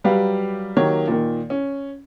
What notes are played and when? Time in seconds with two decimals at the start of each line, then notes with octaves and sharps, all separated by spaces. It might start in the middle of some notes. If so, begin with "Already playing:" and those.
0.04 F#3 G3 G4 B4 F5
0.77 D#3 F#3 A#3 G4 C#5
1.07 A#2 D#3
1.50 C#4